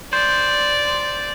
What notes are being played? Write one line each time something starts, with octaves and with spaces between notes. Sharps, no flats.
C5 D5